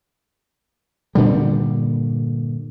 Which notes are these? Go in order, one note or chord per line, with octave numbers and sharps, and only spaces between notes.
G2 A#2 D3 G3